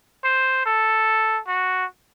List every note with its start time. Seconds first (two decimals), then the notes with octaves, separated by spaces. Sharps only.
0.24 C5
0.66 A4
1.48 F#4